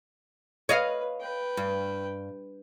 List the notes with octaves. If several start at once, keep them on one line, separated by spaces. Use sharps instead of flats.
B4 C#5 D#5 F5
B4 G5
G2